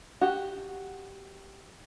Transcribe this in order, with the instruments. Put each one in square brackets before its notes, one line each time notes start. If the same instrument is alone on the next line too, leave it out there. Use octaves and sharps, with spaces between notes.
[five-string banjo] F#4 G4